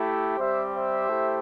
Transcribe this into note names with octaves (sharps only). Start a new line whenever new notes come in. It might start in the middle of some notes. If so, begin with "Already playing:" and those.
Already playing: A3 E4 G4
G3 C4 G4 C5 E5
C5 E5
A3 E4 G4